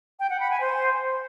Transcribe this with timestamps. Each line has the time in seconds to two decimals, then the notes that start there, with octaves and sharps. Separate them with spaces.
0.20 G5
0.30 F#5
0.40 B5
0.50 G#5
0.61 C5